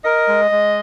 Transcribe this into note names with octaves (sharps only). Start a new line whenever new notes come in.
A#4 D#5
G#3
G#3